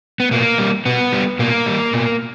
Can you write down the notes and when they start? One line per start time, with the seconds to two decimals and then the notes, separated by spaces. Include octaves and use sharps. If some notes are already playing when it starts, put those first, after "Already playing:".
0.20 B3
0.31 B2 A#3
0.58 G3
0.86 B2 B3
1.12 G3
1.39 B2 A#3
1.66 G3
1.93 B2